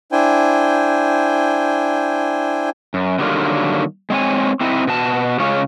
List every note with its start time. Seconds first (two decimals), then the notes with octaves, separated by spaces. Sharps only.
0.12 D4 E4 C5 G5 G#5
2.94 F#2
3.19 D3 D#3 F#3 G3 A#3 F4
4.10 G#3 C4 C#5 G#5
4.61 C4 D#4 E4
4.87 B2 F#4 A5
5.40 C#3 G#3 C#4 F4 C#5